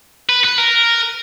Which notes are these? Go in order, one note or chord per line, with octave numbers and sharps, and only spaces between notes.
B4
B4
A#4